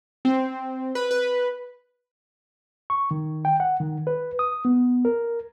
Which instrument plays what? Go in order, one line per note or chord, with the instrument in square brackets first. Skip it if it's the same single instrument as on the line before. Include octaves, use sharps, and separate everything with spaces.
[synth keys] C4
B4
B4
[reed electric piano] C#6
D#3
G5
F#5
D#3
B4
D#6
B3
A#4